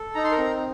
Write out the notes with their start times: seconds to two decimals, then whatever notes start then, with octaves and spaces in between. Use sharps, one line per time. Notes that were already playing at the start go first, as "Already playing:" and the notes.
Already playing: A4
0.14 D#4 A#5
0.24 C6
0.31 A#4 A#5
0.38 C4